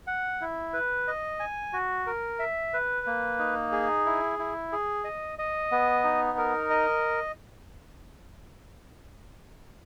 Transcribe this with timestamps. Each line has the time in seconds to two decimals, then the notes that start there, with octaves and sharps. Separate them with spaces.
0.07 F#5
0.41 E4
0.73 B4
1.08 D#5
1.40 G#5
1.73 F#4
2.07 A#4
2.39 E5
2.73 B4
3.07 A#3
3.39 D#4
3.72 G#4
4.06 E4
4.39 E4
4.72 G#4
5.04 D#5
5.39 D#5
5.72 B3
6.04 D#4
6.38 A#4
6.70 D#5